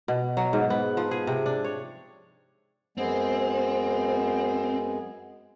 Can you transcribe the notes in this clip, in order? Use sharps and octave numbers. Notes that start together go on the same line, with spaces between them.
B2
F#3
G#2
B3
F3
G#4
C3
D4
C#5
F#2 G#3 B3 C4